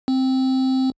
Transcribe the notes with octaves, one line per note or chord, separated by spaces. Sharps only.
C4